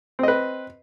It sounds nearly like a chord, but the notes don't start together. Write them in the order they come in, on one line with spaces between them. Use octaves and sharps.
C4 D#5 B4